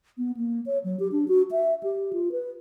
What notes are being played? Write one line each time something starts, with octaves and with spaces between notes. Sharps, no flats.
B3
A#3
C#5
F#3
G4
D4
F#4
E5
G4
F4
B4